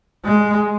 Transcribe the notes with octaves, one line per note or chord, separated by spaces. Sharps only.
G#3